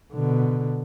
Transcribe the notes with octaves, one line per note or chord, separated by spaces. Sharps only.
B2 D3